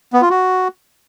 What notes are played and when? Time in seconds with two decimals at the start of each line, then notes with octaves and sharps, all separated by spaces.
0.13 B3
0.22 F4
0.30 F#4